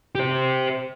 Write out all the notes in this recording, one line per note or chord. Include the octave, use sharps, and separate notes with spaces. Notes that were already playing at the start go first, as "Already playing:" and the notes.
G4 C5